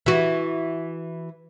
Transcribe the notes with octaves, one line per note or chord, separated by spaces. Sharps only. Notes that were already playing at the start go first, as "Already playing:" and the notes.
E3 F#4